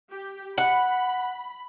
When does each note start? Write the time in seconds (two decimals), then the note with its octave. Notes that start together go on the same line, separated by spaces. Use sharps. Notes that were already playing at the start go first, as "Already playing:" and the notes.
0.11 G4
0.58 F#5 B5